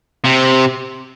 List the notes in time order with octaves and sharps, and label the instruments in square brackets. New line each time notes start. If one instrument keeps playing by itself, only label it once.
[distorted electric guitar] C3